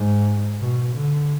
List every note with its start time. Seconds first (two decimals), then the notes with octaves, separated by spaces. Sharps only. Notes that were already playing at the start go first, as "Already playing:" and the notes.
Already playing: G#2
0.60 B2
0.95 D3